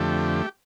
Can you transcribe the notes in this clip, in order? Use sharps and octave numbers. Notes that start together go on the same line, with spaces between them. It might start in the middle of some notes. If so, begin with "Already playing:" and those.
Already playing: F2 D3 A3 G4